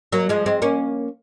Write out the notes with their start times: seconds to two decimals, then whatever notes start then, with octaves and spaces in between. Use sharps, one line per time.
0.12 F#3 A#3
0.29 F3 G#3
0.46 G#3 C4
0.62 A#3 C#4